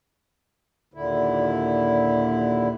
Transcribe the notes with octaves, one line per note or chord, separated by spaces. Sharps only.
D#2 A#2 D3 E4